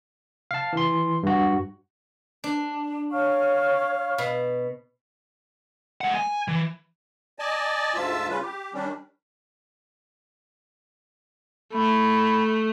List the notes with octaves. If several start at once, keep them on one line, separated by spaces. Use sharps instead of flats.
F5 A5
E3 C6
G2 F#4
D4
C#5 F5 C#6 F6
B2
G#3 F#5
G#5
E3
D5 D#5 G#5 A5
D2 G#2 F4 E5 A5 E6
C#3 G3 C#4 F4 B4
G4
D#3 G3 C#4 D4
A3 B5